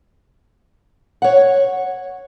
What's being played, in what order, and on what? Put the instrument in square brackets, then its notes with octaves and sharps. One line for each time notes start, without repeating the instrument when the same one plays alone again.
[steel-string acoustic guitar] C#5 F#5